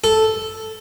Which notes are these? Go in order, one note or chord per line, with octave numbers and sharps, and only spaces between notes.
A4